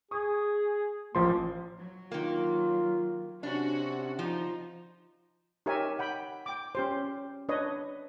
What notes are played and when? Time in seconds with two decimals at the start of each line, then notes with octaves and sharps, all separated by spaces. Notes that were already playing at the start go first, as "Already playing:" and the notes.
0.11 G#4 C#6 D#6
1.15 A1 F3 A#3 C6
1.78 F#3
2.12 D#3 A#3 F4
3.43 C3 C#4 D4 F#4
4.19 F3 D#4
5.66 D#4 G4 A#4 C#5 E5 G#5
5.99 F#5 G5 B5
6.46 G5 D6
6.75 C#4 G4 C5
7.49 D4 B4 C#5 D#5